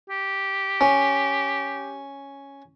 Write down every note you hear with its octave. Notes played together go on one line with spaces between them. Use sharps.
G4
C#4